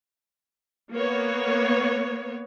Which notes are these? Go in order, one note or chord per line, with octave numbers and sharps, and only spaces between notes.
A#3 B3 C#5